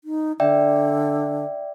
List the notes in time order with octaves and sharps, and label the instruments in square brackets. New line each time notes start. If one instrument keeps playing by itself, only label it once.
[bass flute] D#4
[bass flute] D3 [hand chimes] D5 E5 G5